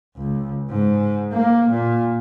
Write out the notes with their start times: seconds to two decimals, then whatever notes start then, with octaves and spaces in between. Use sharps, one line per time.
0.17 C#2
0.70 G#2
1.33 A#3
1.70 A#2